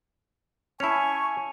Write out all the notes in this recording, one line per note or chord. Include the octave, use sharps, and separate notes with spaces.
C#4 E4 G#5 A5 C#6 C#7 F7